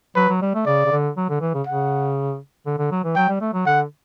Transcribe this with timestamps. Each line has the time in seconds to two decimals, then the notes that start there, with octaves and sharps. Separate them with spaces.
0.16 F#3 B4
0.29 F#3
0.41 G3
0.54 A3
0.66 C#3 D5
0.85 C#3
0.91 D3
1.17 F#3
1.29 D3
1.41 E3
1.54 C#3
1.67 C#3 F#5
2.66 D3
2.78 D3
2.91 F#3
3.04 E3
3.16 F#3 G5
3.28 G3
3.41 A3
3.53 F#3
3.66 D3 F#5